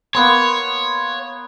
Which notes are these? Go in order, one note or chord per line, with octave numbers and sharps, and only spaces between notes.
A#3 B3 C#5 C6